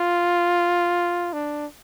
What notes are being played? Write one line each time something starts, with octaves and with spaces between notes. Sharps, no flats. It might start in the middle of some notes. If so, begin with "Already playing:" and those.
Already playing: F4
D4